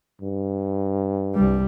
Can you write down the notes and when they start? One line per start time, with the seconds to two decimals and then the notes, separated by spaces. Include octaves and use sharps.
0.22 G2
1.35 C2 G3